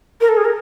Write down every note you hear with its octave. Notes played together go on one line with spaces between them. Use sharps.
A#4
A4
G#4
A#4